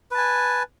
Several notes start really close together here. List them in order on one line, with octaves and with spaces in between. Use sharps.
B4 A5 G#5